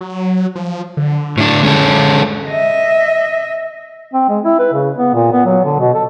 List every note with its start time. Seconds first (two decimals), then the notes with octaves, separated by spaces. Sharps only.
0.01 F#3
0.55 F3
0.97 D3
1.38 A2 D4
1.63 G#3 C#4 A4
2.49 D#5 E5
4.14 C4
4.29 G#3
4.45 E4
4.59 B4
4.74 C#3
4.98 B3
5.14 A#2
5.33 B3
5.45 F#3
5.64 D3
5.80 B2
5.94 A4